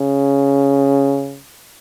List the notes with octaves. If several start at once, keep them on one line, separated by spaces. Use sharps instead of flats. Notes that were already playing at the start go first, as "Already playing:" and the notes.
Already playing: C#3